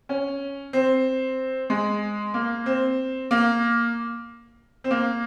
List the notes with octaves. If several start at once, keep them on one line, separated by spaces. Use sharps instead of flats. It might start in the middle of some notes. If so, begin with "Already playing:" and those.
C#4
C4
G#3
A#3
C4
A#3
C4
A#3